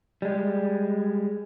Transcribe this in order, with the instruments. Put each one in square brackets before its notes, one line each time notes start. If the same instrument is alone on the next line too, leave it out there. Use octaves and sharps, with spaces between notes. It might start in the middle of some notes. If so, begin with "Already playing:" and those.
[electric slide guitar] G3 G#3